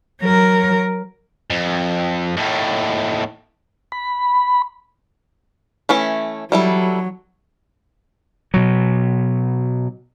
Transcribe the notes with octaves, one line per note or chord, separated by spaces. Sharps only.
F#3 A#4
F2
D#2 A2
B5
E3 A3 C#4
F#3 G3 E4 A4
B2 F#3